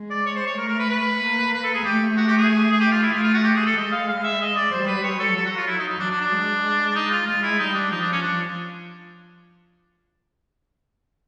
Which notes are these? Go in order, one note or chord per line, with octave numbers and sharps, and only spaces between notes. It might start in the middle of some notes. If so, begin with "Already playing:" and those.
Already playing: G#3
D5
C#5
C5
C#5
A3 A#4
A#4
B4
B4
A#3
B4
A4
G#4
A3 G4
F#4
G4
G#4
G#4
G4
F4
E4
A3 F4
F4
F#4
G4
G#4
A4
G#3 D#5
F5
F5
E5
D#5
D5
G3 C5
B4
C#5
A4
F#3 A4
F#4
F4
E4
D#4
D#4
F#3 D4
D4
D4
G#3
D#4
F4
G#3 F4
E4
G3 D#4
D4
F3 D#4
D4
C#4
D4